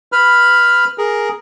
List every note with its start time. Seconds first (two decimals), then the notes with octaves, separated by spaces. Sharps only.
0.12 B4 B5 F6
0.98 G#4 A#4